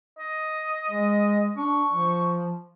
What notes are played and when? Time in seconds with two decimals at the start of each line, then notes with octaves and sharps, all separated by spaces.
0.19 D#5
0.90 G#3
1.57 D4 C#6
1.93 F3